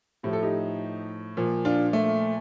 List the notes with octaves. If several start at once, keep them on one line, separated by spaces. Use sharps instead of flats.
A2 F3 G4
A4
D#4 G4
A#2 F3
D4 F4
A3